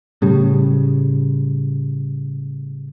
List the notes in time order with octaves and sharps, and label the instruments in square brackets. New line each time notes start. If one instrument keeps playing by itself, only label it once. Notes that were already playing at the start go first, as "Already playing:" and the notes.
[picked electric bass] A2 C#3 G3